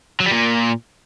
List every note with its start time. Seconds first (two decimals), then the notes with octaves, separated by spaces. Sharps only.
0.20 F#3
0.26 G3
0.32 A#2